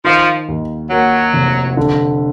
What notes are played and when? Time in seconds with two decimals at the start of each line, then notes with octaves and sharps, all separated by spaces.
0.04 D#3 F3
0.48 D#2
0.90 F#3 A#3
1.33 F1
1.77 D3